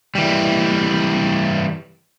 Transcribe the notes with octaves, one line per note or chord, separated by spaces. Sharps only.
E3 G3